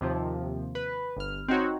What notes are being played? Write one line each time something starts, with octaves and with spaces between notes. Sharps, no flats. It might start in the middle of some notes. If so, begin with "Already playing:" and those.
D#2 C3 F3
B4
G1 F6
C4 D#4 F#4 C#5